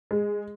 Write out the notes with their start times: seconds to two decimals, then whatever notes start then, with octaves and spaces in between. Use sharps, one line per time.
0.11 G#3